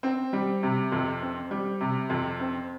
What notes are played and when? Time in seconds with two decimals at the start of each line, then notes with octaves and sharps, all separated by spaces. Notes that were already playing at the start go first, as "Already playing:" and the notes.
0.03 C4
0.33 G3
0.63 C3
0.92 F2
1.22 C4
1.51 G3
1.81 C3
2.09 F2
2.40 C4